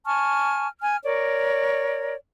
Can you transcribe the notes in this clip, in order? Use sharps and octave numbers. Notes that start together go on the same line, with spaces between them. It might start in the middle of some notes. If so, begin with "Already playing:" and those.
G#5 A5 C#6 F6
G#5 F6
A#4 C#5 D5